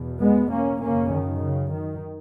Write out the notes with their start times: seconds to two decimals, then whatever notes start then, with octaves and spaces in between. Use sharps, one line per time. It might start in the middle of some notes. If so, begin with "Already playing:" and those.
Already playing: E2 B2
0.21 G#3 B3
0.51 A#3 C#4
0.81 F#2 C#3 A#3 C#4
1.11 D#3
1.41 C#3
1.71 D#3